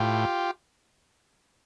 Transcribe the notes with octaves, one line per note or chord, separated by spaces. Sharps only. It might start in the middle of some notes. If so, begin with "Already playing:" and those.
Already playing: A2 F4 G4